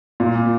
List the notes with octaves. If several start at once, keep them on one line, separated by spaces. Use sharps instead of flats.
A#2